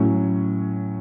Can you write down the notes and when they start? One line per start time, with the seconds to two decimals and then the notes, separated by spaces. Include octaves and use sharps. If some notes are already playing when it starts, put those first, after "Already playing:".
Already playing: A2 F#3 C#4